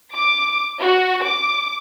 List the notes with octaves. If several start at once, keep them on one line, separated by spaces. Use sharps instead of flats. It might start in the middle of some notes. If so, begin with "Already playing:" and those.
D6
F#4
D6